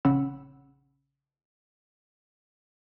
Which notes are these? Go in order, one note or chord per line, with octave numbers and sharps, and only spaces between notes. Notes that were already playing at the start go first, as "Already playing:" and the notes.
A#1 C#3 C#4 F#5 B5 E6